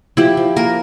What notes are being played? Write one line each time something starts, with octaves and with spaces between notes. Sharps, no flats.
F3 E4 G4
F3
A#3 A#4